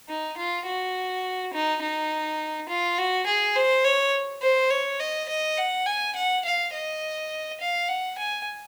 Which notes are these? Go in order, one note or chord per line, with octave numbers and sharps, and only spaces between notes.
D#4
F4
F#4
D#4
D#4
F4
F#4
G#4
C5
C#5
C5
C#5
D#5
D#5
F#5
G#5
F#5
F5
D#5
F5
F#5
G#5